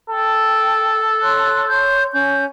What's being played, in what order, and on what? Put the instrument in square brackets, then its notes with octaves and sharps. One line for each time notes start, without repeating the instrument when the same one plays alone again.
[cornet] A4 [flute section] G5
[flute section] C#5 C6 F#6
C#5 C6 G6
C#4 G6